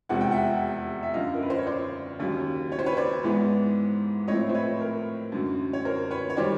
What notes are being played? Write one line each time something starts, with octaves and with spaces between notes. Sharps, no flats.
F1 E2 C3 F3 G#3 F#5
G5
E5 F#5
E5
F#2 D3 F3 D#5 F5
A#4
B4
C5
C#5
C5 D5
D#2 C#3 F#3
C#5
C5
B4 C#5
C5 D5
G#2 E3 G#3 B3
A2 F3 A3 C4 E4 C#5 D#5
C5
B4 C#5
A#4
F#2 D3 F#3
C#5
A#4 C5
B4 C#5
C#5
D#3 G3 C5 D5